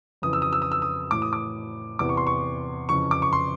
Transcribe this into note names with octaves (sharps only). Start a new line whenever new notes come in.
F2 C#3 E3 D#6
E6
D#6
E6
D#6
E6
D#6
A2 E3 D6
D#6
D6
E2 C3 E3 D6
C#6
C6
C#6
F2 C#3 E3 C#6
D6
C#6
C6